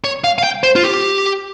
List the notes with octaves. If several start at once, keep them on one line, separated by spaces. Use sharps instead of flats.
C#5
F5
F5
G5
C5
F4
G4